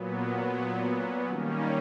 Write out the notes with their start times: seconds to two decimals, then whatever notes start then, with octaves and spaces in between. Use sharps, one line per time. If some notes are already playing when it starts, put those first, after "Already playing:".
Already playing: A#2 F#3 B3
1.28 D#3 G3 A#3 C#4